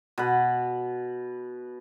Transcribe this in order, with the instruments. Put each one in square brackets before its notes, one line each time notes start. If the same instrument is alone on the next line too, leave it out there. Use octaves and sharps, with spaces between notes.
[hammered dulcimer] B2 B4